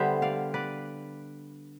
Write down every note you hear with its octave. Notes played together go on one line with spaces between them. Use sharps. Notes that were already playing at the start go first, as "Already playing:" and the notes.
Already playing: D3 G3 B3 C5 E5
D5 F5
B4 D5